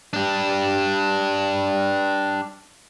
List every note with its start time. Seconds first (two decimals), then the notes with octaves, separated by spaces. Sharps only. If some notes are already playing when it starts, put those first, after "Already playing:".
0.13 D4 G4